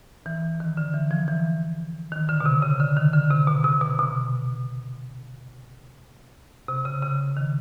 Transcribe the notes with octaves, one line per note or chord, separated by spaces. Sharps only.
E3
D#3
D3
E3
F3
E3
D#3
D3
B2
C3
C#3
D3
D#3
D3
C3
B2
C3
B2
B2
C3
C#3
C#3
D#3